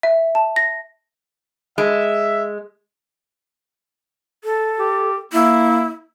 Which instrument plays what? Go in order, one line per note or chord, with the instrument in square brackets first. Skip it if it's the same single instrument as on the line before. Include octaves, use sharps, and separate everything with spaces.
[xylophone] E5
A5
A#6
[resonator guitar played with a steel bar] G#3 [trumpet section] E5
[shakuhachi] A4
[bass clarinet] G4
[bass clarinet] A#3 [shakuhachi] E4